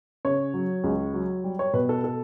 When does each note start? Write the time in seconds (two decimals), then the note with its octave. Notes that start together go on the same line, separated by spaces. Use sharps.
0.25 C#3 C#5
0.54 F#3
0.84 C#2
1.14 F#3
1.44 G3
1.59 C#5
1.74 B2 B4
1.89 A4
2.04 A4